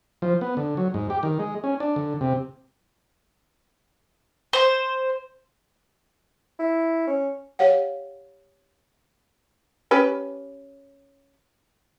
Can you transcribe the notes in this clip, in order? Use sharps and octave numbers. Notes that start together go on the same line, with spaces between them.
F3
B3
D3
F#3
G#2
G4
D#3
G#3
C#4
D4
D3
C3
C5
E4
C#4
G4 C#5 F5 F#5
C#4 G4 B4